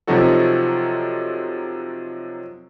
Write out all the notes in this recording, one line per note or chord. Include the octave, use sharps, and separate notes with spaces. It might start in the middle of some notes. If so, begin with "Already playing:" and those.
C3 F3 F#3 D#4 F#4 A4